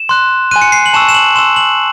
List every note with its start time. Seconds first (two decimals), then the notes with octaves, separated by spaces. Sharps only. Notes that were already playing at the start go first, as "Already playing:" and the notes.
Already playing: E7
0.09 C6 F#6
0.51 G#5 C6 F#6 D#7
0.61 C#7
0.72 C7
0.86 F#7
0.93 A5 C#6 E6 E7
1.09 E7
1.14 F#7
1.36 C6 E6 E7
1.56 F#7